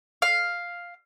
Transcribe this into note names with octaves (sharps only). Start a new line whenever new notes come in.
F5